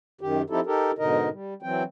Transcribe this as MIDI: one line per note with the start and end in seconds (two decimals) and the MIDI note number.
0.21 0.42 42
0.21 0.42 51
0.21 0.42 67
0.50 0.60 53
0.50 0.60 60
0.50 0.60 63
0.50 0.60 64
0.50 0.60 67
0.50 0.60 69
0.66 0.91 63
0.66 0.91 67
0.66 0.91 69
0.66 0.91 70
0.99 1.29 44
0.99 1.29 47
0.99 1.29 50
0.99 1.29 63
0.99 1.29 70
0.99 1.29 75
1.32 1.54 55
1.62 1.83 52
1.62 1.83 54
1.62 1.83 60
1.62 1.83 79